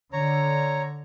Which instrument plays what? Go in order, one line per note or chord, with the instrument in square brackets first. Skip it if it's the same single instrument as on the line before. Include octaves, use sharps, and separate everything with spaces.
[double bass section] D3 [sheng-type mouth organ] C#5 A#5